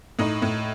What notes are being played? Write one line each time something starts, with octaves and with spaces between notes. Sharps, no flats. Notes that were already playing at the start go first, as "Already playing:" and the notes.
A2 D#4
A2